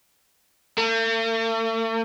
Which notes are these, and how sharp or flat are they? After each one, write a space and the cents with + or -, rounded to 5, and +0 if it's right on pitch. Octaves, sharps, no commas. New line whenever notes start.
A3 +45